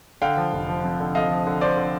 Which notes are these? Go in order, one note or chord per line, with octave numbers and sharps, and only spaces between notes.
D3 F5 G5
F3
F1
F3
F2
D3
F2 D#5 F5
F3
D3
F3 C5 D5
D3